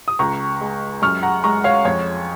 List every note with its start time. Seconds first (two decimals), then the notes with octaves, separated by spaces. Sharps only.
0.08 D#6
0.19 C#2 A#5 C#6
0.61 G#3
1.02 F#2 C#6 F6
1.23 F#5 A#5
1.44 G#3 A#5 C#6
1.64 C#5 F5
1.85 F2 C#5